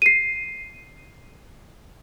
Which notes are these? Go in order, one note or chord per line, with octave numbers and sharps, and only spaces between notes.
C7 D#7